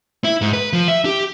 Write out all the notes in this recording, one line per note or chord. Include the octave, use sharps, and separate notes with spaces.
E4
G#2
B4
F3
E5
G4